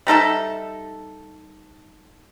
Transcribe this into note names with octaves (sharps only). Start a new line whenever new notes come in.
G3 D#4 A4 E5